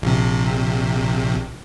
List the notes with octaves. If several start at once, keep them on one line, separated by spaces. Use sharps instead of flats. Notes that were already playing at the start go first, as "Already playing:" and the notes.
A#1 C3